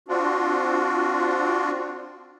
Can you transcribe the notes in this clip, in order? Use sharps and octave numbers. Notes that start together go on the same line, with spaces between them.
C4 D4 F4 F#4